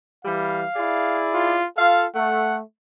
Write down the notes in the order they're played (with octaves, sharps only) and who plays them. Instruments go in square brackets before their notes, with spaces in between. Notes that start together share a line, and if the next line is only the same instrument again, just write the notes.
[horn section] E3 G3 [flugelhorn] F5
[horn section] E4 G#4 D5
[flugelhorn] F4
[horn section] F4 F5 [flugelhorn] A4
[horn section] A3 [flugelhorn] F#5